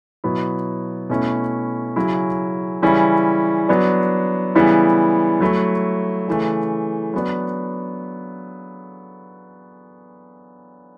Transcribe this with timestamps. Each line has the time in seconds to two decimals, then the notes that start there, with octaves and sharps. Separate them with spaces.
0.24 B2 F#3 B3 E4
1.10 B2 A3 C#4 E4
1.96 C#3 F#3 C#4 E4
2.82 C#3 E3 G3 C#4 E4
3.69 F#3 B3 D4
4.55 C#3 E3 G3 B3 E4
5.41 F#3 A3 E4
6.28 C#3 E3 A3
7.14 F#3 B3 D4